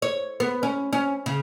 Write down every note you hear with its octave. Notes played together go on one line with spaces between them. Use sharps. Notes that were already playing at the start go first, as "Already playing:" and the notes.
C#5
B3
C#4
C#4
C#3